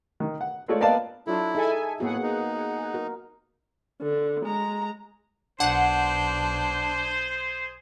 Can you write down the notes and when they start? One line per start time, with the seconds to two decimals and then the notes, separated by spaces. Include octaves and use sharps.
0.20 D#3
0.41 F#5
0.68 G#3 A3 F4 A4 C#5 D5
0.80 A#3 B3 D5 D#5 F5 A5
1.27 F#3 D4 E4 F4 A4
1.55 D#4 G#4 A4 E5 G#5
2.00 A2 A#3 B3 F#4 G#4 F#5
2.23 D#4
2.94 F#4 A#4
4.03 D3
4.45 G#3 A#5
5.60 B1 D4 G#4 C5 F#5